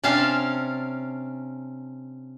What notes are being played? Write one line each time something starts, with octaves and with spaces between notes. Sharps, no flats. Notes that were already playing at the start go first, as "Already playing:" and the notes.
C3 C#4 D4 F5 A5